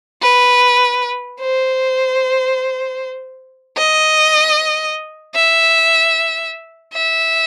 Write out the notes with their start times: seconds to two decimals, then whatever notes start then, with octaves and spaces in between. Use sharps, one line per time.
0.22 B4
1.41 C5
3.77 D#5
5.35 E5
6.93 E5